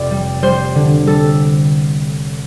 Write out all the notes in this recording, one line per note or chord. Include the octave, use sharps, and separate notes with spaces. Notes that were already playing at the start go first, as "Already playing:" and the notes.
Already playing: F1 D5
G3
G3 C5
D3
G3 A4